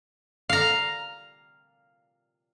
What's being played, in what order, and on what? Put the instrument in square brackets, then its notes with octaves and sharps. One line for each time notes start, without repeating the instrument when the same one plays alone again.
[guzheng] F5 A#5